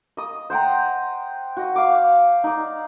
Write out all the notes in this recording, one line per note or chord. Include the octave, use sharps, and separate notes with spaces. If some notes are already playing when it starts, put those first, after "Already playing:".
D#5 D#6
C5 F#5 G5 A#5
F#4 D#5
F5 D6
D#4 D5